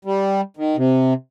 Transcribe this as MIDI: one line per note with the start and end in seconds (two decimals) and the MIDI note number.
0.05 0.41 55
0.57 0.76 51
0.77 1.13 48